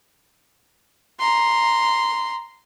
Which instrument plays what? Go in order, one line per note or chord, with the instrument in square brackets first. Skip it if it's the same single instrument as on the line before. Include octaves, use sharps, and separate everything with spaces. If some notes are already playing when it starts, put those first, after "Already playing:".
[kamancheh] A#5 C6